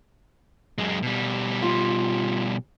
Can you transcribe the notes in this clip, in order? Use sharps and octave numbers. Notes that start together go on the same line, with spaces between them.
F#2 G#3
B2 G3
F4